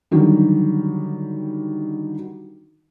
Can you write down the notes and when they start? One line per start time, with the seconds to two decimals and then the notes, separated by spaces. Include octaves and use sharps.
0.11 D3 D#3 F#3 G3